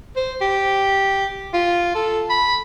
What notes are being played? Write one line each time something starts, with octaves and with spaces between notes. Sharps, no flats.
C5
G4
F4
A4
B5